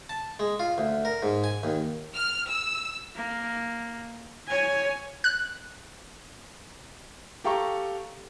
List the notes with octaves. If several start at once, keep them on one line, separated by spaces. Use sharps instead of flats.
A5
G#3
F4
D2
A#4
G#2
G#5
D#2
F6
E6
A#3
C#5 G#5
F#6
G4 A4 F5 G5 A#5 C#6